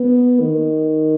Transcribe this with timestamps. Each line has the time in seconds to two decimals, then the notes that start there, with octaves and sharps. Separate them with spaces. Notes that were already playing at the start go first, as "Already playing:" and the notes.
Already playing: B3
0.40 D#3